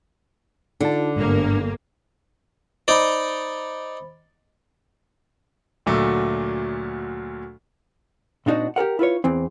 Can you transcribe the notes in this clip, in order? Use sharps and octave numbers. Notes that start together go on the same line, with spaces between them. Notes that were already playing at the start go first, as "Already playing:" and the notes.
D3 D#4 F4 A5
G1 G#2 A#3
D#4 C5 D5 B5
D2 A#2 F#3 A3
A#2 C4 D4 D#4 F4 F#4
G4 G#4 A#4 F#5
E4 F4 B4 C#5
E2 E3 C4